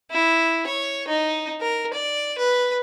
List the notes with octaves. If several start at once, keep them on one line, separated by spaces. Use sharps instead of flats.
E4
C#5
D#4
A#4
D5
B4